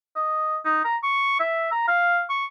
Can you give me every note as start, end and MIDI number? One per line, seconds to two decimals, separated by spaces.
0.16 0.57 75
0.65 0.81 63
0.85 0.96 82
1.03 1.38 85
1.40 1.69 76
1.72 1.86 82
1.88 2.22 77
2.30 2.45 85